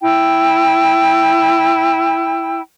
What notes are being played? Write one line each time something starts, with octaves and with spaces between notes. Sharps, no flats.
E4 G5